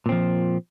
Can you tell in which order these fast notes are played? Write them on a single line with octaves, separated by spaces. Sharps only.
A#2 C4 F3